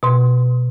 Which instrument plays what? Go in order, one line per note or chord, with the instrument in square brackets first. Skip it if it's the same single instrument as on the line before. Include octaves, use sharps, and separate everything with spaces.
[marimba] B2 C6